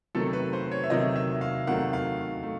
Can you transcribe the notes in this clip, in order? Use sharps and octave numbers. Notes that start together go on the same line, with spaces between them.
C3 D#3 F#3 A3 A4
B4
C5
C#5
E5
C3 D#3 F#3 A3 D#5
E5
F5
C3 D#3 F#3 A3 F#5
F5
A3